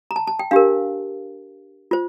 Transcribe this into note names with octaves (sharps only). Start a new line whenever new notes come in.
A#5
A5
A5
G5
D4 G4 A#4 F5
F4 C5